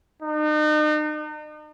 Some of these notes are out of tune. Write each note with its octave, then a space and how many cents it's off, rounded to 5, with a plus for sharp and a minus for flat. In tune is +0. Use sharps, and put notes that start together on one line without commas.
D#4 -40